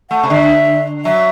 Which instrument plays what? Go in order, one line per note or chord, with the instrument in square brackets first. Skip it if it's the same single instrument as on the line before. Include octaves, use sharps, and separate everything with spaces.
[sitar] A3 [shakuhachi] F#5
[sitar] C3
[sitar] D3 [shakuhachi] E5
[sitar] F#3 [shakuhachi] E5